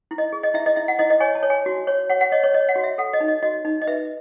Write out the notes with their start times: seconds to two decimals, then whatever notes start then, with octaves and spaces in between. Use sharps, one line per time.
0.11 E4
0.18 D#5
0.33 G#4
0.43 D#5
0.54 E4 E5
0.66 D#5
0.76 E4 E5
0.88 F#5
0.99 E4 D#5
1.10 D#5
1.20 C#5 G#5
1.35 A5
1.43 C#5
1.50 G#5
1.66 F#4
1.87 C#5
2.10 C#5 F#5
2.21 F#5
2.32 C#5 D#5
2.43 C#5
2.54 C#5 D#5
2.69 F#5
2.76 F#4
2.83 E5
2.98 A4 F#5
3.13 D#5
3.20 D#4
3.28 D#5
3.42 F#4 D#5
3.65 D#4
3.82 D#5
3.87 B4 E5